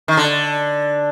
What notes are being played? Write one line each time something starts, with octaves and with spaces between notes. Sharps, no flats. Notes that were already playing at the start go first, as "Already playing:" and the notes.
D#3
D3